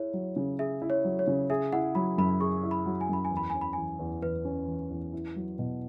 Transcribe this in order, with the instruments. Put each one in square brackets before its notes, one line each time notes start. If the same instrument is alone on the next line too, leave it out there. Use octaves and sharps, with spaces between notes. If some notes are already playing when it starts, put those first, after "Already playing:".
Already playing: [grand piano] E4 G#4 [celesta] C#5
[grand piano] F#3
C#3
[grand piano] G#4 [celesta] E5
[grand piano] E4
[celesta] C#5
[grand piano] F#3
[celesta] C#5
[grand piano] C#3
[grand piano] G#4 [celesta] E5
[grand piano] E4 [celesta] F#5
[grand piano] F#3 [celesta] B5
[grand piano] F#2 [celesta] B5
[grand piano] G#4 [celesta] C#6
[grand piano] E4
[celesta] B5
[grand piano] F#3
[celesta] G#5
[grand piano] F#2 [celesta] B5
[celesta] G#5
[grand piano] E2
[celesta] B5
[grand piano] C#4 [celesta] G#5
[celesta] B5
[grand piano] E3 [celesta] G#5
[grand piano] E2
[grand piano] E2 [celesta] B4
[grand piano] C#4
E3
E2
E4
F#3
B2